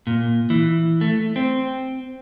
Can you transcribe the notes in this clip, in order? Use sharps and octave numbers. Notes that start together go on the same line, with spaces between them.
A#2
E3
A3
C4